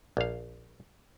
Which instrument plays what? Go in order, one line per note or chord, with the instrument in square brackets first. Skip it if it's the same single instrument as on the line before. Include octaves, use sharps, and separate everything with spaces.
[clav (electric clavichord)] A#1 F5